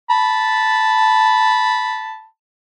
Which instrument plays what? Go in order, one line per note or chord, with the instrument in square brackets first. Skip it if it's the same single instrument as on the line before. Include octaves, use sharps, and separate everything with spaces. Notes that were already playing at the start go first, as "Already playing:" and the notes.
[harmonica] A5 B5